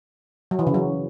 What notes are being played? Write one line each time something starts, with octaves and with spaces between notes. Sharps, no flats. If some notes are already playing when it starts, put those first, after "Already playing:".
F#3
E3
C#3
F#3